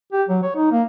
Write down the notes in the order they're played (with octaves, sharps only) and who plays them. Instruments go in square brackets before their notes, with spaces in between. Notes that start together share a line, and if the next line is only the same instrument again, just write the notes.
[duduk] G4
F#3
C#5
D#4
A#3